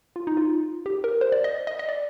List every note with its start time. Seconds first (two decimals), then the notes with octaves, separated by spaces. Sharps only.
0.16 F4
0.27 D#4
0.37 F4
0.86 G4
1.04 A#4
1.21 C5
1.32 D5
1.44 D#5
1.67 D#5
1.79 D#5
1.89 D5